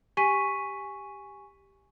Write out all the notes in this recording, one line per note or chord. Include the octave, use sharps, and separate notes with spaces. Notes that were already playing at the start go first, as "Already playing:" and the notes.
G4 G#5 C#6 B6 D#7